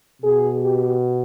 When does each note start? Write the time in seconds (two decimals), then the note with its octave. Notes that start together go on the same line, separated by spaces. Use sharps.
0.22 B2 G#4
0.63 G4